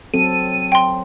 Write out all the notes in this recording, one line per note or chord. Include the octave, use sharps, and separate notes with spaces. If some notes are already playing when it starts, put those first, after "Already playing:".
F#3 C4 A4 D#7
G5 C6